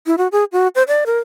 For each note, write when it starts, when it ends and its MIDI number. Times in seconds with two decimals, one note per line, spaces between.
0.07 0.16 64
0.18 0.28 66
0.32 0.44 68
0.52 0.68 66
0.75 0.83 72
0.88 1.04 74
1.06 1.18 70